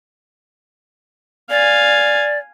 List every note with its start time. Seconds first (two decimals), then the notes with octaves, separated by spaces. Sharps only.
1.50 D5 F5 G#5